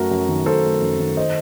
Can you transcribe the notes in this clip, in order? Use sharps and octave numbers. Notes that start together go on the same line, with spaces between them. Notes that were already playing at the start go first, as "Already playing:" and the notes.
Already playing: F#2 A3 F#4 A#4
F#2
D#3
F#2 A4 C5
A3
F#2
D#3
C5 D#5